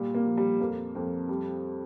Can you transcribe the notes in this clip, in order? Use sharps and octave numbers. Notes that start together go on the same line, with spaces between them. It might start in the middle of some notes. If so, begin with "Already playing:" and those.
Already playing: A#2 G3
A#3
F3
G3
F2 A#3
F2
G3